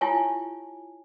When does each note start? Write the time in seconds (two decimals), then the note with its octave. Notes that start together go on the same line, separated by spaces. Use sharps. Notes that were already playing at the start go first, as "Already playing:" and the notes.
0.01 E4 F4 G4 C#5 G#5 A5